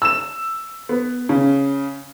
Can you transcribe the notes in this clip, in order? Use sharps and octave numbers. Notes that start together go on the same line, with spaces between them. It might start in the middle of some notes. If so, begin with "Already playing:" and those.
E6 E7
B3
C#3